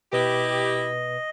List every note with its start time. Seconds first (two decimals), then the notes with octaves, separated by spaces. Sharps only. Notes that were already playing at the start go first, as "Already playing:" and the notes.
0.13 B2 E4 G4 B4 D#5